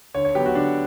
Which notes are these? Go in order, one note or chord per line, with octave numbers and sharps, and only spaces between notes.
D3 C#5
C#5
F#3 B3 G4
F#4
D3 D4